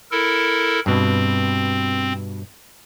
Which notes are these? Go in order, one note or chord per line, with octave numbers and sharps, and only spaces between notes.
E4 A4 A#4
G2 B2 C4